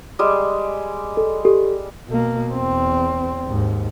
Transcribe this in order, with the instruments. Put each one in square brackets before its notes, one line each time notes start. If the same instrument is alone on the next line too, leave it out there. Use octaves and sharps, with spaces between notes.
[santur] G3 G#3
[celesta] A4
G4 A4
[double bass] B2 A#3
E2 C4
D#2 G#2